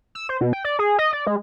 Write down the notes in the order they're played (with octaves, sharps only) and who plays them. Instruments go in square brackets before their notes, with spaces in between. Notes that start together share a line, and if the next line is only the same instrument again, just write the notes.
[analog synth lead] E6
C5
B2
G5
D5
G#4
D#5
D5
G#3